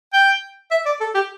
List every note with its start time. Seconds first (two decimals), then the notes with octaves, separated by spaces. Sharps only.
0.13 G5
0.71 E5
0.86 D5
1.00 A4
1.15 G4